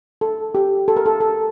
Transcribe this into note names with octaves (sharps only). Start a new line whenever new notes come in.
A4
G4
A4
A#4
A4
A4